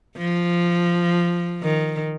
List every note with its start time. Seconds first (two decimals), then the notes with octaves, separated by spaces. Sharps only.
0.18 F3
1.63 D#3